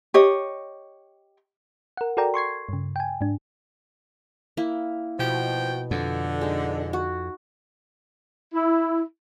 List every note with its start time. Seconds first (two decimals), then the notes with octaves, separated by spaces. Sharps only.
0.14 G4 C#5 D#5
1.97 A#4 F#5
2.17 F#4 A4 A#4 D5 G5 A#5
2.34 C6 C#6 G#6 C7
2.69 G2 C#3
2.96 G5 G#5
3.21 G#2 D4
4.57 A#3 E4
5.19 B2 F3 F#4 G5
5.91 F2 D3
6.41 G#3 D#4
6.93 F#4
8.54 E4